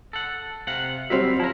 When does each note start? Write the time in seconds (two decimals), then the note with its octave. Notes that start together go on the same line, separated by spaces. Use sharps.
0.13 A4 F#5
0.67 C3 F5 F#5
1.10 F#3 G3 C4 E5 F5
1.40 F3 E4 A#4